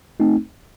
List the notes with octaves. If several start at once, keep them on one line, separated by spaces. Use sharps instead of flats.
A3 C4 D#4